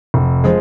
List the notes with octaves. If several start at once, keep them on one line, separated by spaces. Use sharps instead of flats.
F1
F3 G#3